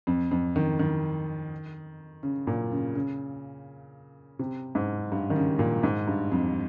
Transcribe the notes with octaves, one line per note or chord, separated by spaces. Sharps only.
F2
F2
D#3
D#3
C#3
A#2
C#3
C#3
C3
G#2
G2
D#3
C#3
A#2
G#2
G2
F2